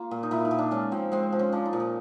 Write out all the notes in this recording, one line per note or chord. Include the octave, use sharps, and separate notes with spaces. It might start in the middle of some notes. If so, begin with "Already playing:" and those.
Already playing: A#3 F4
A#2
D#4
A#2 E4
D#4
A#2
D4
G#3 C#4
F3 C4
G#3 C4
F3
C#4
F3 D4
D#4
A#2
D#4